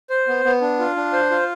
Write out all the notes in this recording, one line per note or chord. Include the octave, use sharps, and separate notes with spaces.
C5
B3
B3
D4
F4
D4
C5
F4